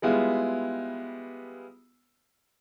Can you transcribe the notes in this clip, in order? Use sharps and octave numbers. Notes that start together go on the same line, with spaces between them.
G3 G#3 B3 E4 F4